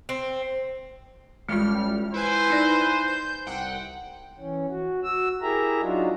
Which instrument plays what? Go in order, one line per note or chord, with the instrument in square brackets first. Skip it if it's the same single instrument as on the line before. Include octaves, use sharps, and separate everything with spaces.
[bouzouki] C4
[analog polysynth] A1 G3 F6 [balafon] G#3 F4
[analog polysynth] E4 B4 G#5 [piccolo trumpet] C5
[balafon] D#4 D5
[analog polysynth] G6
C2 F#5 G5
[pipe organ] E3 C#4
F#4
F#4 E6
E4 G4 G#4 A#4 E5 A#5
F#3 D4 D#4 F4 F#4